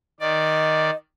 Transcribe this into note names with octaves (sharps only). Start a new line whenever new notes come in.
D#3 D5 D#5